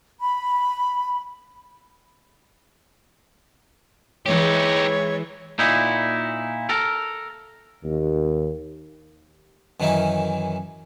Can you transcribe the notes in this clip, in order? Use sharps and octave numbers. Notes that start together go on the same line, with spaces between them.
B5
E3 G#3 D#4 G4 C#5
A#2 D#4 E4
A4 A#4
D#2
F#2 D#3 E3 C#4 D#4 E4